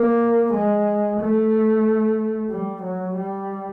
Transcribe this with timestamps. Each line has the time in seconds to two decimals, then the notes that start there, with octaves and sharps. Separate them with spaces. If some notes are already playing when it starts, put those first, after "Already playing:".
Already playing: A#3
0.54 G#3
1.20 A3
2.51 G3
2.83 F#3
3.16 G3